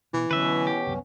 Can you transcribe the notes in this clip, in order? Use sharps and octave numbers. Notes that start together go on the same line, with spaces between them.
B2 E3
B2 D3 F#3 C#4 B4 E5
G4
C2 F#2 C3